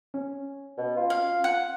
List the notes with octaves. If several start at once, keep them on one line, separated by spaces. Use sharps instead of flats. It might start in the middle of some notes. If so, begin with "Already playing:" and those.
C#4
B2
F4
F5
F#5 F#6